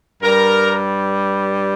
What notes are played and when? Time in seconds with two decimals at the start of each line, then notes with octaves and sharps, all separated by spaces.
0.22 G2 G3 A#4